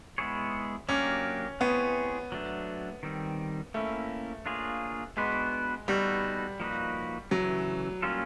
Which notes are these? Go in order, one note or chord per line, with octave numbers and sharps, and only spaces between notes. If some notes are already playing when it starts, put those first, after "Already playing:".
G#3 B3 E4 G#4 C#5
F#3 A#3 C#4 D4 G4 A#4
B3 C4 E4 G#4 C#5
F#3 A3 D4
D#3 G3 C4
A3 A#3 C#4 E4
A#3 D4 F4 G#4 C#5
G#3 B3 D4 F#4 B4
G3 B3 D#4 F#4 A4
F3 A#3 D#4 F#4 B4
C#3 E3 F#3 A3
G3 A#3 C#4 F4 A4